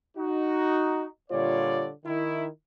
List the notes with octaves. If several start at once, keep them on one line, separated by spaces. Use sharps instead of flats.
D#4 F#4
A#2 D3 G3 F4 C#5 D5
D#3 E4